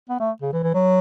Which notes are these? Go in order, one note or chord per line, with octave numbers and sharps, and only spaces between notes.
B3
A3
C#3
E3
E3
F#3